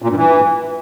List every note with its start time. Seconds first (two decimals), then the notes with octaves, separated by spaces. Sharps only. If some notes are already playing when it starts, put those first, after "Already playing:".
0.02 A#2
0.09 G2
0.16 E3